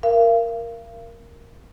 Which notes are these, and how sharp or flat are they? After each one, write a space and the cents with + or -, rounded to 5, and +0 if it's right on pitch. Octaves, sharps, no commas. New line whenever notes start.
A#4 +0 F5 -35